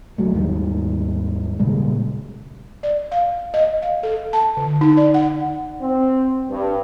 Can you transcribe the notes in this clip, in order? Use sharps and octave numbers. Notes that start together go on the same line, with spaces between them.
D2 F#3 A3
D#2 G#2 D#3 G3
A#2 C#3 G3 G#3
D5
F5
D#5
F5
A4
A5
D3
D#4
D5
F#5
C4
G2